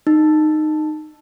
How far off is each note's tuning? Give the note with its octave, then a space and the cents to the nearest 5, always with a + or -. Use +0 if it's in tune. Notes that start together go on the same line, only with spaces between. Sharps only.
D#4 -15